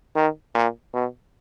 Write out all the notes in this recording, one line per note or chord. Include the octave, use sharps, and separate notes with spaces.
D#3
A#2
B2